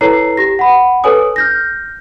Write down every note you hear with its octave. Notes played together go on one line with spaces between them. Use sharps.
E4 A4 B4 C#5 A#5 C7
G4 A#6
F#5 B5
A4 B4 C#5 G#5 D#6
F6 G6 A#6